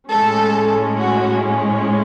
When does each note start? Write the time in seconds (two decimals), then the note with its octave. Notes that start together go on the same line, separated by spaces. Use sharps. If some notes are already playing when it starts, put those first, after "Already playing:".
0.10 A2 G#3 C#4 A4
0.97 F#4